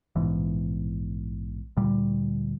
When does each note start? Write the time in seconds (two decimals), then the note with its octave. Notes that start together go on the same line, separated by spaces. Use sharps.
0.16 A#1 G#2 B2 E3
1.77 D2 A#2 G3